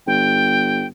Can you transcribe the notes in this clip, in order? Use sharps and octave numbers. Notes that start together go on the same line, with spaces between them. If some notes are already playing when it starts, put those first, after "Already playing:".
G1 G5